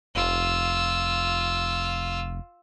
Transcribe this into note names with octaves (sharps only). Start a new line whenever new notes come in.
F1 F4 E6